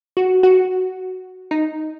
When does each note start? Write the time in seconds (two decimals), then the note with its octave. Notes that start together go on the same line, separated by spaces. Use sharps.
0.17 F#4
0.43 F#4
1.51 D#4